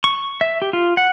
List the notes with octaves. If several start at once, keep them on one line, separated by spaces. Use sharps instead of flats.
C#6
E5
G4
F4
F#5